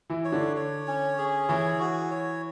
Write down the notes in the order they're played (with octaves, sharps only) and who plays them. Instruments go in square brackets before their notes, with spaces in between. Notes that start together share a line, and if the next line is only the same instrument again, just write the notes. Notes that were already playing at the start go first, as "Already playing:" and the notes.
[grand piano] E3 E4
[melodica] C#5
[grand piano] D3 D4
[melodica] C#5
C#4
G#4
[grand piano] E3 E4 [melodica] C#5
[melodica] F#4
C#5